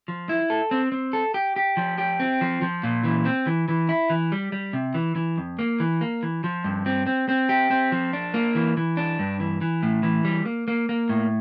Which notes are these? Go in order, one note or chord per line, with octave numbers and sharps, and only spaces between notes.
F3
E4
A4
C4
C4
A4
G4
G4
F3
G4
C4
F3
F3
A#2
E3
C4
E3
E3
E4
E3
G3
G3
C3
E3
E3
F2
A#3
E3
A#3
E3
F3
G2
C4
C4
C4
G4
C4
F3
D4
A#3
E3
E3
D4
G2
E3
E3
A2
E3
G3
A#3
A#3
A#3
A2